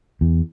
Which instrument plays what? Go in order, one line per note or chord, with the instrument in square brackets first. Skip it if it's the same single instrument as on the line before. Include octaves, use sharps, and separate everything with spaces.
[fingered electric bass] E2